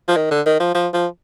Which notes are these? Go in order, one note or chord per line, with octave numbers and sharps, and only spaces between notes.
F3
D#3
D3
D#3
F3
F3
F3